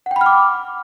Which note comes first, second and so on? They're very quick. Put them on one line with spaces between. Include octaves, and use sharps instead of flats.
F#5 G5 B5 F6 D6